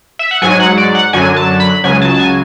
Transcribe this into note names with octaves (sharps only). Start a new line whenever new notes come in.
E5
F#5
G#2 F#3 G#5
F#5
D5
F#5
F#2 D3 F#3 G#5
A5
B5
C#2 C#3 F#3 G#5
A5
A5
G#5